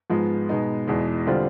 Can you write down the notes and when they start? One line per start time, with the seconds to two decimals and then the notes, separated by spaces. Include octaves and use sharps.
0.10 G#2 F3 G#3 B3
0.49 B2 G#3 B3 D#4
0.87 E2 B2 G#3
1.27 D3 G3 C4 F4